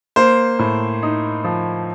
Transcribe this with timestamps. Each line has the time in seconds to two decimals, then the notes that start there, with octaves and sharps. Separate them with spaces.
0.16 A#3 C5
0.59 A2
1.03 D#4
1.44 F3